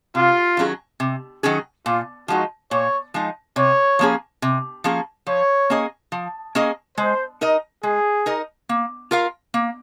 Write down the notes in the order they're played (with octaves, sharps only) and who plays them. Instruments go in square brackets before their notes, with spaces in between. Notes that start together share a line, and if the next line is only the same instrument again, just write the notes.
[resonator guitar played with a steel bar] C3 [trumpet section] F4
[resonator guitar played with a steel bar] D#3 F#3 C#4 G#4
C3
D#3 F#3 C#4 G#4
[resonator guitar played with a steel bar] A#2 [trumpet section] F4
[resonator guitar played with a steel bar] F3 G#3 D#4 [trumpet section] F#4
[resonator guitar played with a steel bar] A#2 [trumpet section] C#5
[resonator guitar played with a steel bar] F3 G#3 D#4
[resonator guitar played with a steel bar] C3 [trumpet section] C#5
[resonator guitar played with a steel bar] F3 A#3 C#4 G#4
C3
F3 A#3 C#4 G#4
[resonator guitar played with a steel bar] F3 [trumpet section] C#5
[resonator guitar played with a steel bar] A#3 C#4 G#4 D#5
F3
A#3 C#4 G#4 D#5
[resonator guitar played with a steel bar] G#3 [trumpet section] C5
[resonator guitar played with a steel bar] D#4 A#4 D#5
[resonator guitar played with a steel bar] G#3 [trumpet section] G#4
[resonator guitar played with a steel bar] D#4 A#4 D#5
A#3
F4 A#4 F5
A#3